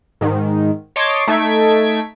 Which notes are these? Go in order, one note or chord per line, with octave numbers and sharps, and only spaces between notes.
G#2 D#3
C#5 D#5 A5 C6 D6
A3 D#4 A4 G#6 B6 D7